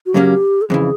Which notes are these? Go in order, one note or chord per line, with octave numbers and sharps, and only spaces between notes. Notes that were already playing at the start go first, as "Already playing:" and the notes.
F#4
F#2 C#3 F#3 A#3 C#4 G4
A4
F2 C#3 E3 G#4